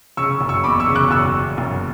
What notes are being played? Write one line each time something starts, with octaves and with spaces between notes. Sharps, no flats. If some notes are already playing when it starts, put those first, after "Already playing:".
C#3 C#6 E6
F#1
C#6 E6
E2 B5 D6
C#6 E6
C#3
D6 F#6
F#1 C#6 E6
E2
F#1